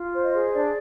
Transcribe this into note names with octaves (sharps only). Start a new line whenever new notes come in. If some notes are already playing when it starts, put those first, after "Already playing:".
Already playing: F4
C5
D#5
G#4
D4 D5